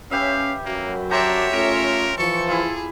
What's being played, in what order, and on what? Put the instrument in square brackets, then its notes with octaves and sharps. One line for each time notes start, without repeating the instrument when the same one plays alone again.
[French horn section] C#4 [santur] G4 B4 E5 [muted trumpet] F5
[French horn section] F#2 F#3 [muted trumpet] A#3
[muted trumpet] D4 [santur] G4 C5 A#5 [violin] C#5 E5
[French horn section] A3 C#4 F4 [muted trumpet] A#4
[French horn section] E3 F3 [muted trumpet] A4 [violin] C#6
[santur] E4 F4 [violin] G#4